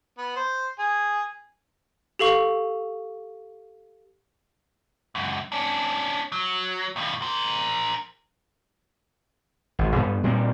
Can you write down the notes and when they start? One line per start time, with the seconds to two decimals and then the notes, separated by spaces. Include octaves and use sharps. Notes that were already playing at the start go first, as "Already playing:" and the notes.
0.18 B3
0.36 C5
0.79 G#4
2.19 G4 A4 F5 C#6
5.15 C#2 F#2
5.52 C#4 D4
6.32 F#3
6.96 D#2 A2
7.22 A#4 C5
9.79 G#1
9.96 G2 B3
10.24 A#2 G3 A#3 C4